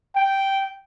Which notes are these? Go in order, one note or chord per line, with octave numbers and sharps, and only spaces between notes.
G5